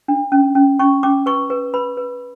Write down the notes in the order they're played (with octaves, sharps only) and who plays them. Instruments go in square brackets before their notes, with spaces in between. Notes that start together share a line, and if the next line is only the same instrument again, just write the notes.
[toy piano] D4
C#4
C#4
C#4 C#6
C#4 D6
B4 C#6
B4
B4 B5
B4